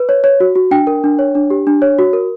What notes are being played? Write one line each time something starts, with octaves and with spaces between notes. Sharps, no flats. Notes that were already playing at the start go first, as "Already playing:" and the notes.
Already playing: B4
C#5
C#5
F#4
F#4
D4 G5
A#4
D4
C#5
D4
G4
D4
C#5
F#4
A#4